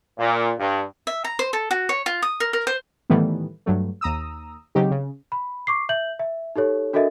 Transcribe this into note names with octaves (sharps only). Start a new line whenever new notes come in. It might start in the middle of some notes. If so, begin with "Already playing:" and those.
A#2
G2
E5
A#5
C5
A4
F#4
C#5
F4
D#6
A#4
A#4
C5
A2 D#3 E3 G3 A3 B3
G2 F#3 A3
D#2 A#5 D#6 E6
C#3 F#3 C4 D#4 G4
C#3
B5
C#6 D6 C7
E5 G6 F#7
E5
D#4 G4 A4 C#5
D4 F#4 A4 A#4 D#5 E5